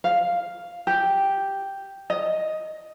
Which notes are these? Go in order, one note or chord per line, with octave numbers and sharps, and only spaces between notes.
F5
G4
D#5